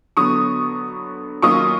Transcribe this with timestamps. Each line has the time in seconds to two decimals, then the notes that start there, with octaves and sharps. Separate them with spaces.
0.17 D3 F#3 B3 C#6 D#6
1.42 D#3 F#3 A#3 C#4 F4 C#6 D#6